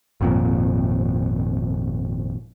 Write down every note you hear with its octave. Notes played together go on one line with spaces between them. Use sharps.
G#1 F2 A#2